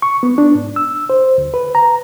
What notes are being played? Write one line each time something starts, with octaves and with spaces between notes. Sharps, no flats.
C#6
B3
D4
G#2
E6
C5
D2
B4
A#5